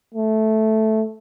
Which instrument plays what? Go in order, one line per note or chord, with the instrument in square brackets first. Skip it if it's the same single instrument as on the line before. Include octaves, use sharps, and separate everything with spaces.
[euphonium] A3